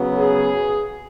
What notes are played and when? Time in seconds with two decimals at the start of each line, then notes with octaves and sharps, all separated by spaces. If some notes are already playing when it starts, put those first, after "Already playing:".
Already playing: C#3 F#3 B3
0.16 G#4